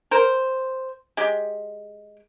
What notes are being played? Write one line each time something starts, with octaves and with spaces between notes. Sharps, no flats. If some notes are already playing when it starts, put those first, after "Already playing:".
A#4 C5
G#3 G4